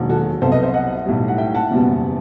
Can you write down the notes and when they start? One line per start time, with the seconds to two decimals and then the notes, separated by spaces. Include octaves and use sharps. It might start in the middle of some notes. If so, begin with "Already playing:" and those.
Already playing: E1 D#2 D#3 F#3
0.09 F#4 A4
0.41 C2 B2 F#3 A4 C5
0.52 B4 D#5
0.63 C5 E5
0.74 D#5 F#5
1.05 B1 A2 G3
1.28 F#5
1.38 E5 G5
1.55 F#5 A5
1.71 F#1 E2 B2 G3